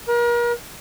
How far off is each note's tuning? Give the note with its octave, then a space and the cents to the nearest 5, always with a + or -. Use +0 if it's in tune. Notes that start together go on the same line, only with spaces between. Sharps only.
A#4 +40